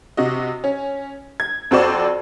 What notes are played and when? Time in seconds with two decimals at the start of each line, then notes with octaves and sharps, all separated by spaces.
0.17 C3 F#4 D#5
0.64 C#4
1.40 G#6
1.71 F2 C4 F#4 C5 D5 E7